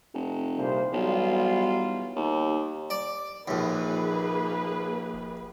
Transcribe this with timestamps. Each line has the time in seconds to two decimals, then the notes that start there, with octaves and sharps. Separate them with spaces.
0.14 F1
0.58 C2 A#2 C5
0.93 B1 E3 G3 F4
2.16 D#2
2.90 D5
3.48 A#1 D#2 A#3 G#4 B4
5.14 E1